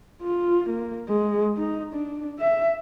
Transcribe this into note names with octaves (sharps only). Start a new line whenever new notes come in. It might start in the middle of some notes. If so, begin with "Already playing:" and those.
F4
A#3
G#3
D#4
D4
E5